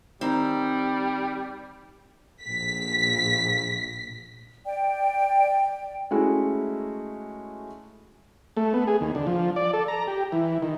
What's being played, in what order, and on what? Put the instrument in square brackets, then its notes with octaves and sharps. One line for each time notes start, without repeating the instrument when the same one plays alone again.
[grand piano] D#3 [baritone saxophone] G3 [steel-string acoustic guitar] C4 A#5
[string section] A#1 B6
[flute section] D5 G5
[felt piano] G#3 A3 C#4 E4 F#4
[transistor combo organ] A3
B3
G#4
D#2
D3
F3
D5
A4
A#5
G4
E3
D#3